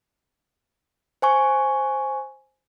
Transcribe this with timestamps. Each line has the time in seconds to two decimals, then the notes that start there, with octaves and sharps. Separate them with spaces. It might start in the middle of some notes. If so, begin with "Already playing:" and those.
1.22 C5 G#5 C#6